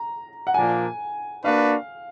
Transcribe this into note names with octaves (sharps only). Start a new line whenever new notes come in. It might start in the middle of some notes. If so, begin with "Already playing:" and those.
Already playing: A#5
F#5
A#2 F3 A#3 D4 G#5
A#3 D4 F#4 B4 F5